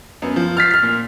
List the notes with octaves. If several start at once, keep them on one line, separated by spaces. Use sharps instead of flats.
F#2 B3
F3
F6 A6 B6 C7
F6 B6
A#2